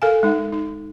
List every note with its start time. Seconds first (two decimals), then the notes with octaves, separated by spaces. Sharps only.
0.02 A4 A#4 F5 G#5
0.23 G#3 D#4 F#5
0.52 D#4